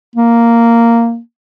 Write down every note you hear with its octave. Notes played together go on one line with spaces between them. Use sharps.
A#3